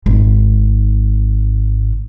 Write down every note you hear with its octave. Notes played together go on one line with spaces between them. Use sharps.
G#1 G#2